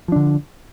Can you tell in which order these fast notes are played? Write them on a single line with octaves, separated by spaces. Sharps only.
F3 D4 D3